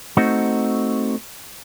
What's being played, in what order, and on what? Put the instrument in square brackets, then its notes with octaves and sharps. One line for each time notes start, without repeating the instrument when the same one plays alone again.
[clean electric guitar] A3 C4 D#4 F#4